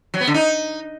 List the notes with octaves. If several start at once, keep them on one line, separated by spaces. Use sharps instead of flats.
F#3
B3
D3
D#4